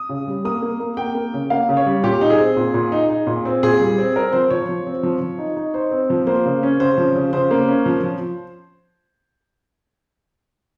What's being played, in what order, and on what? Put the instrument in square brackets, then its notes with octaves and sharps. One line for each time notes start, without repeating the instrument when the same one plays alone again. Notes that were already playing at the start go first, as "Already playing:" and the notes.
Already playing: [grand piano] D#6
C#3
G3
A#3 D#6
A#3
A#3
A#3 G5
A#3
C#3
A#3 F5
C#3
C#5
G3
A#2 G4
D#4
G#4
C4
A#2
A#2
D#4
D#4
A#2
C4
A#2 G#4
G3
C4
C4 A#4
F3 C5
F3 C#5
F3
C4
F3
F3
D#4
D#4
D#4 C5
C4
F3
A#3 C5
C#3
C#4
C#3 C5
F3
C#3
C#3 C5
A#3
C#4
F3
F3